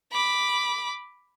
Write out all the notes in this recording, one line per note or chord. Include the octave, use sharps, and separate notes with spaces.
B5 D6